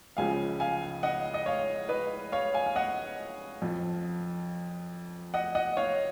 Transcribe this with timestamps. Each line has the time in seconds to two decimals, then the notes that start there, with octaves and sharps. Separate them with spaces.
0.17 C#2 C#3 F3 F5 G#5
0.60 F5 G#5
1.03 D#5 F#5
1.34 D#5
1.46 C#5 F5
1.89 B4 D#5
2.32 C#5 F5
2.54 F5 G#5
2.66 F5
2.76 D#5 F#5
3.62 F2 F3
5.34 D#5 F#5
5.55 D#5 F#5
5.77 C#5 F5